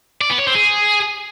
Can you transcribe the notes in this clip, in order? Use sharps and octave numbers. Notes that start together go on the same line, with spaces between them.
D5
B3
C#5
C4
G#4